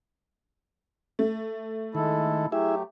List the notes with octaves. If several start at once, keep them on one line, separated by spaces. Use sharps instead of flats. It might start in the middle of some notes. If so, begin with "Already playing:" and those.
A3
D#3 G#3 E4 A4
F#3 A3 E4 G4 G#4 E5